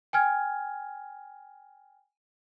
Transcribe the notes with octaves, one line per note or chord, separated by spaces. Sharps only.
G5 G#5 F6 G#6